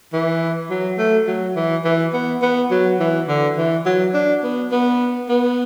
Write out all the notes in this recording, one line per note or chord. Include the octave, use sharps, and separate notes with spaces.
E3
F#3
A3
F#3
E3
E3
B3
B3
F#3
E3
D3
E3
F#3
D4
B3
B3
B3